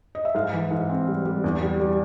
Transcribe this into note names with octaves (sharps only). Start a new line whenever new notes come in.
D#5
E5
G#2 F5
E3
G#2
C4
G3
G3
E2
G3
G3